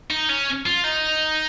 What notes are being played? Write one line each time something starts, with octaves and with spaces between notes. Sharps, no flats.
D#4
C#4
F4
D#4